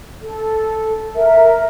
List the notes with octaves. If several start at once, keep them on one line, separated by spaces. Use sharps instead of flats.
A4
A#4 E5